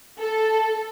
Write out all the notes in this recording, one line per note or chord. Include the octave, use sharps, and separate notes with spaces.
A4